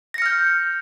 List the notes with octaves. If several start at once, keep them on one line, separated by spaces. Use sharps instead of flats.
F6 G6 A#6 C#7